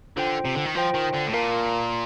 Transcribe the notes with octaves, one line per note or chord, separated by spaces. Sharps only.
D3 F4 C5 G5
C3
D3
D#3
F3 F4 C5 G5
D#3
D3
A2
A#2 F4 A#4 F5 A5